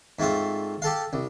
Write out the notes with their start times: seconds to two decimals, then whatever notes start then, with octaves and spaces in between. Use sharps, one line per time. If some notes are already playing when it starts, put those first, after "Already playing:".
0.19 G#2 A3 C4 F4
0.82 G4 A4 F5
1.13 C2